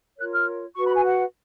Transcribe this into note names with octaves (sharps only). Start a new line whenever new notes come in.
F4 A#4 C#5 F#6
F6
F#4 B4 C#6
B5
G#5
F#5